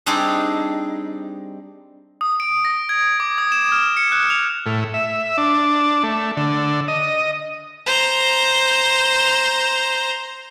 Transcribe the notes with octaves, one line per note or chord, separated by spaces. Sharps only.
G3 C4 D4 D#4 G#4
D#6
D7
A#6
G#6
D6
D#6
E7
F6
C#7
F#6
F7
A2
E5
D4
A3
D3
D#5
C5 A#5